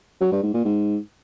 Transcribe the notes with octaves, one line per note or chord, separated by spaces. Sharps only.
F#3
G2
G#2
A#2
G#2